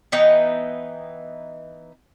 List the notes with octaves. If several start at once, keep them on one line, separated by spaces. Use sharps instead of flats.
E3 B3 D#4 G5